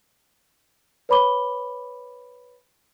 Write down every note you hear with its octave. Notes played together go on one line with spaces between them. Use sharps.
B4 C#5 B5 D6 G7